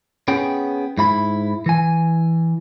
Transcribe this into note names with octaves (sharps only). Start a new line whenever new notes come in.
B3 C#4 G#4 G5
G#2 E4 B5
E3 G#5